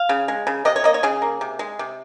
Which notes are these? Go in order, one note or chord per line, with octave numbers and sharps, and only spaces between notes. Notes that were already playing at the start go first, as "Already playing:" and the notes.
Already playing: F5
C#3
G#3
C#3
C3 D#5
C#5
A#3 D#5
C#5
C#3 G#4
A#3
C3
G#3
C3